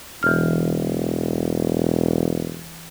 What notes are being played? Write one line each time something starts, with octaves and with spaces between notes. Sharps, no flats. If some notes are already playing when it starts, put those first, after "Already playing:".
E1 E3 F6